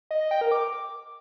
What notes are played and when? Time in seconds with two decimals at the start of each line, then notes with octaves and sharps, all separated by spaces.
0.11 D#5
0.21 D#5
0.31 G5
0.41 A#4
0.52 D6